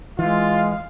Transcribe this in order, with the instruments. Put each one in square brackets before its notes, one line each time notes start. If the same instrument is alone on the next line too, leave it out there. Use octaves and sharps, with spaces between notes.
[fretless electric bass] E3 [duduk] G#3 [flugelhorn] F4 [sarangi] F5